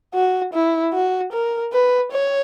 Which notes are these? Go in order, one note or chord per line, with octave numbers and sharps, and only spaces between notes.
F#4
E4
F#4
A#4
B4
C#5